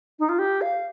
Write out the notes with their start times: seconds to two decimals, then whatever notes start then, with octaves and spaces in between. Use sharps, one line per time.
0.19 D#4
0.29 F4
0.39 G4
0.61 F5